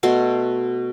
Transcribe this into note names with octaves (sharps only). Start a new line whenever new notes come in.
B2 A3 F#4 C6